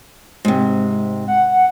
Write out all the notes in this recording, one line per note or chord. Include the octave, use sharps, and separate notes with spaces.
G#2 C3
F#5